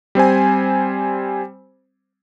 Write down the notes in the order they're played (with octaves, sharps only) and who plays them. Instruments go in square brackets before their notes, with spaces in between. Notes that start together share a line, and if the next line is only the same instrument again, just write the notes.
[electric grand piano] G3 C4 C5 G#5